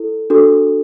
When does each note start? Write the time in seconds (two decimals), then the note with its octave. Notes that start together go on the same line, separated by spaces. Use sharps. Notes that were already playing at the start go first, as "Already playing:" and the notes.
Already playing: E4 A4
0.30 D4 F#4 A4